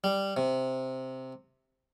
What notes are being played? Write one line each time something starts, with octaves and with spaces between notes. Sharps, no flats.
G3
C3